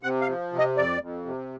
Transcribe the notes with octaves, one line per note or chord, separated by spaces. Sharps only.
C3 F#5
F5
F3
C3
D#5
F2 D5
F2
C3